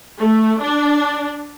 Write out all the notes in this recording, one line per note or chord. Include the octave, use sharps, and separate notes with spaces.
A3
D4